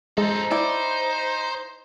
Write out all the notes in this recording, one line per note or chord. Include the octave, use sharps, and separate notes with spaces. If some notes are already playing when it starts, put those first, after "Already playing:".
G#3 D#4 A4 C5
E4 C5 D5